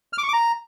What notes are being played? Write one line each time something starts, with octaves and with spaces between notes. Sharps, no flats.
F6
D6
C#6
D6
A#5